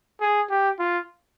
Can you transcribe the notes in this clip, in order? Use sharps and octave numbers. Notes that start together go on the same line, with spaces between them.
G#4
G4
F4